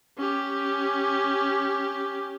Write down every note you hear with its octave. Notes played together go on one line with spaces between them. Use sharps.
C#4 G4